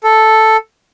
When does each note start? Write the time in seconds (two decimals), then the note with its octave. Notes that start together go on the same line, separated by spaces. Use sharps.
0.04 A4